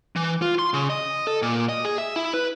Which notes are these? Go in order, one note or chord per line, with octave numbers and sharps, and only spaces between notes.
E3
F4
C6
C#3
D#5
A4
A#2
D#5
G#4
E5
E4
B4